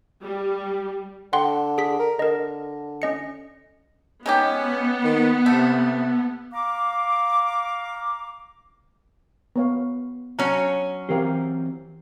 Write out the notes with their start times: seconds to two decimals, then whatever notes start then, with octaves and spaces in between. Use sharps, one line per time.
0.21 G3
1.33 D3 F#5 G5 C6
1.78 G#4 B6
1.99 A#4
2.19 D3 A#4 D#5
3.02 C#4 D#5 C#7
4.26 G#3 B3 C#4 D#4 G4
5.04 D#3
5.46 C3 A3
6.53 F5 A#5 D6
9.56 B3 C#5 F5
10.39 F#3 C#4 A#5
11.09 E3 C4 G4 A#4 C5 F5